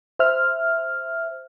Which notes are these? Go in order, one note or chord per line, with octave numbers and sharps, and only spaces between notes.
C5 E5 F6